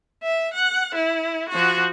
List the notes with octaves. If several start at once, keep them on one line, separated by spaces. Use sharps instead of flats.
E5
F#5
E4
F3 F#4